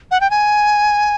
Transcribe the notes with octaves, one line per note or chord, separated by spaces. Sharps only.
F#5
G5
G#5